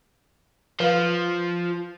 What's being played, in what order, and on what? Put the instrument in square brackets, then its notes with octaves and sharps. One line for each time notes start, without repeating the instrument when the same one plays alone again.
[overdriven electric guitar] F3 [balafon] B4 F5